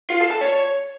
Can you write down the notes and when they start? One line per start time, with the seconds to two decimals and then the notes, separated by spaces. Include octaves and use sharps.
0.10 F4
0.20 A4
0.31 A5
0.41 C#5